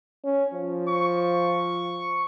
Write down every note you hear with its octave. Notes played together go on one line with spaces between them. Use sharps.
C#4
F3
C#6